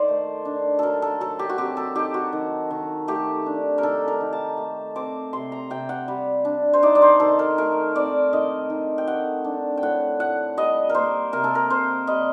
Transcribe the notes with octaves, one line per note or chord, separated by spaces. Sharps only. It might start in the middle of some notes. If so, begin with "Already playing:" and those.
Already playing: D#3 C5 D5
A3
D4
F#3 A4 A#4
A4
F#3 A4
G4
F#4
C4 G4
A4
D#4 G4
F#4
D#3
D#3
A3 G4
D4
A#4
D#3 A4
A#4
D#3
A5
A3
C4 D6
C3 C6
A#5
C3 G5
F#5
G3
D4
C5
D#4 D5
D5
C5
D#3 A4
A#4
A3 A#4
C4 D5
D#3 D#5
D#3
G5
A3 F#5
D4
G5
A2 F#5
A2 F#5
G3 D#5
A#4
A#3 C5
C3 A#4
A4
A#4
C3 C5
G3 D#5